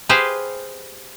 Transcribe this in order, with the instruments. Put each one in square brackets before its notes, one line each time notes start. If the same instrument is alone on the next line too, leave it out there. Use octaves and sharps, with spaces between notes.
[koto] G4 G#4 B4 C5 F5